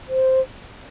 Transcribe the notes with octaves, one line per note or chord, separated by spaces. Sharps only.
C5